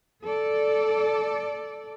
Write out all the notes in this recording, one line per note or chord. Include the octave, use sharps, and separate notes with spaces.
A4 D5